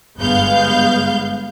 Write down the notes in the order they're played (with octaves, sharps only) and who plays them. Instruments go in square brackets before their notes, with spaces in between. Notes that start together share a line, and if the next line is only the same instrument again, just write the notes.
[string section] G1 G#3 B3 F5 G6